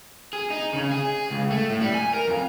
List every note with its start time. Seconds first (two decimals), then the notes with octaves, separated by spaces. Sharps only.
0.33 G#4
0.50 D#4
0.73 C#3
0.91 G#4
1.30 C#2
1.50 A3
1.70 A2
1.81 G3
1.94 G#5
2.14 A#4
2.28 F2